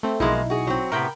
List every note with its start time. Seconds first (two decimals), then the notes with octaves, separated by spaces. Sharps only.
0.03 A3 C4
0.20 B1 F3 G#3 A#3 D#4 E4
0.50 F#4 G#4
0.67 F#3 C4
0.92 A2 C3 B3 A#4 G5 B5